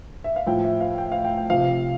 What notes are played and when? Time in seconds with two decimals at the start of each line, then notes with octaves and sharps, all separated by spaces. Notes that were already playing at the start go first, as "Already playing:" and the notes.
0.24 E5
0.36 F5
0.46 A2 F3 G5
0.64 E5
0.81 F5
0.98 G5
1.12 F5
1.25 G5
1.37 G5
1.49 C3 F3 F5